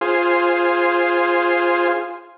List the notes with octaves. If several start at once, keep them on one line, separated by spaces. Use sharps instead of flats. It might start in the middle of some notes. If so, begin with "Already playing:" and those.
F4 G#4 C5